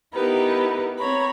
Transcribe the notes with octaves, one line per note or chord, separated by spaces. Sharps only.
B3 D#4 E4 G4 A#4 B4
C4 C#5 A#5 B5